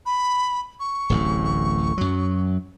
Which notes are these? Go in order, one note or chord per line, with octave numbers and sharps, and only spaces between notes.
B5
C#6
D1 A1 A2
F#2 F#3